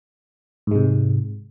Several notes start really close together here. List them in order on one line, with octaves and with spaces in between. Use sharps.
G#2 G#3 C3